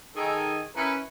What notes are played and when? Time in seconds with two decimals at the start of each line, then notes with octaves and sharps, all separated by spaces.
0.16 D#3 G#4 A4
0.75 C#4 E4 A#4 B4